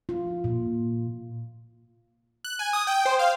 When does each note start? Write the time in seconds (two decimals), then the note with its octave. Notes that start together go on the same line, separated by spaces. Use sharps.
0.09 F4
0.44 A#2
2.45 F#6
2.59 G#5
2.73 D#6
2.87 G5
3.05 C5
3.19 F5